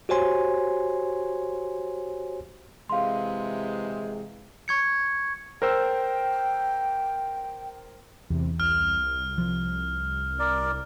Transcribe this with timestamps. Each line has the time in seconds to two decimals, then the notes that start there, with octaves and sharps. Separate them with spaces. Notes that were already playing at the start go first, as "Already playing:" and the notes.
0.09 F#4 G4 C5 C#5 G#5 C6
2.90 C3 E3 G#3 F5 C6
4.68 C#6 G#6 C#7
5.62 A#4 C5 G5 E6
8.30 E2 C3
8.60 C2 F6
9.38 F3
10.39 A#4 D5